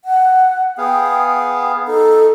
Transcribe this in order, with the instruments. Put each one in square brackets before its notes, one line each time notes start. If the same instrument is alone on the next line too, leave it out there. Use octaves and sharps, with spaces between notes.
[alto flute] F#5
[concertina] B3 G#4 F5 [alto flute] G5
[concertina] D#4 [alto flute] A4